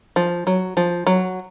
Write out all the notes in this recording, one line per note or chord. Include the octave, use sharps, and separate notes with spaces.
F3
F#3
F3
F#3